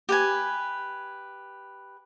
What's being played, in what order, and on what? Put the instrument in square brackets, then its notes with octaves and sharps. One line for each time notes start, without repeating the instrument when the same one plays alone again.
[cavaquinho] G4 B4 G#5